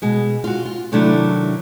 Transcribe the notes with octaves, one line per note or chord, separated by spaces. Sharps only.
B2 G#3
F4 F#4
F4
C3 D#3 F#3 A3 D4 E4